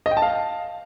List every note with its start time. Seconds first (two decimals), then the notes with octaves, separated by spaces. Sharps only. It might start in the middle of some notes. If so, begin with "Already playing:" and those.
0.06 D#5
0.11 G5
0.17 A5
0.22 F5